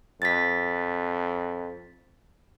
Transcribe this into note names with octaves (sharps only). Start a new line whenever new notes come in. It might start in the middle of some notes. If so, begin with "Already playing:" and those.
F2 A6 B6